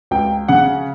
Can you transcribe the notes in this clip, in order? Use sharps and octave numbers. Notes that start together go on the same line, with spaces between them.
C#2 G5
C#3 F#5